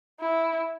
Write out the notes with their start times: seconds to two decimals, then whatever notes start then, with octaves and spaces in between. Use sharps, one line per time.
0.20 E4